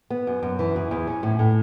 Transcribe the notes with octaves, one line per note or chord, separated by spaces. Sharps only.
B3
F#2
F#2
E3
E2
E2
C#4
A2
A2